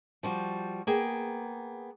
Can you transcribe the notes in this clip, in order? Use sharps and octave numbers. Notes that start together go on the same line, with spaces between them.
F3 G3 F#4
A#3 B3 G#4 G5